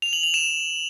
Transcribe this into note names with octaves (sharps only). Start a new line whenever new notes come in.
F7
F#7
F7
E7